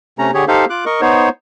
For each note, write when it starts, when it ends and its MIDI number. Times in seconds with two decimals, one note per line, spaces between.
0.19 0.31 48
0.19 0.31 57
0.19 0.31 61
0.19 0.31 82
0.34 0.45 50
0.34 0.45 67
0.34 0.45 68
0.34 0.45 73
0.48 0.65 63
0.48 0.65 67
0.48 0.65 69
0.48 0.65 72
0.48 0.65 77
0.70 0.85 65
0.70 0.85 86
0.70 0.85 90
0.86 1.01 70
0.86 1.01 75
0.86 1.01 85
1.01 1.29 59
1.01 1.29 63
1.01 1.29 72
1.01 1.29 73